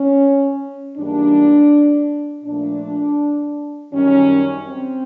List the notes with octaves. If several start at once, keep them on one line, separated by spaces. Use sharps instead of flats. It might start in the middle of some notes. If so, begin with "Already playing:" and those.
Already playing: C#4
G#2 E3 G3 A#3 D4
A#2 F3 A3 D4
F#2 D#3 G3 C#4
C4